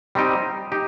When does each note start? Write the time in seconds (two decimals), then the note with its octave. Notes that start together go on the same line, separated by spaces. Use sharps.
0.15 G3 C4 D#4 G4
0.72 D#4 G4